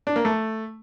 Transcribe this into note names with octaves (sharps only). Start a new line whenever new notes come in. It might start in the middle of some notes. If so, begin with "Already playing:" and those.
D4
A#3
A3